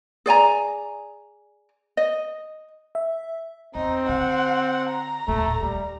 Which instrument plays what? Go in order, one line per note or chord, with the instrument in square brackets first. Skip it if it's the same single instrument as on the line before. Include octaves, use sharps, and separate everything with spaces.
[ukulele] G#4 D5 G#5 A#5
D#5
[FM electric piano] E5
[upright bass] E2 [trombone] C4 [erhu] D#4
[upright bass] D3 [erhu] F#5
[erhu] A#5
[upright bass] D#1 A2 [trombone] A3
[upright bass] D#2 [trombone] G3